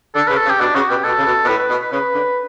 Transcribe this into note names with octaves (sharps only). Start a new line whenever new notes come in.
D3 A4
C#3 B4
A4
C#3
G4
B2 D4
C#3 F#4
B2 G4
B2 A4
C#3
B2
B2
A2 B4
B4
B2
B4
C#3 B4
D3